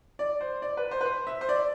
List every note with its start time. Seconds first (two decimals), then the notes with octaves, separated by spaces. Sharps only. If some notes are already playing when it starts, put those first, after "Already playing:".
0.19 D5
0.41 C5
0.62 D5
0.77 B4
0.91 C5
1.01 B4
1.05 C5
1.27 E5
1.41 C5
1.49 D5